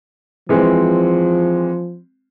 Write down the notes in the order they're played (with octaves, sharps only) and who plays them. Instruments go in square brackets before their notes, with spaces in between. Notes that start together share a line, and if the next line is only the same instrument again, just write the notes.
[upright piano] E3 G#3 C4 [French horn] F3